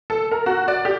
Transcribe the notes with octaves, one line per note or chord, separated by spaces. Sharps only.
A4
A#4
F#4
D5
G4